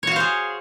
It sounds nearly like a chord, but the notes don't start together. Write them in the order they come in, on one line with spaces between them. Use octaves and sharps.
C#5 F#4 F5 C5 G#4